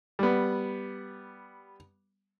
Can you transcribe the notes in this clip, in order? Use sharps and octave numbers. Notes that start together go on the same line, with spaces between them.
G3 B3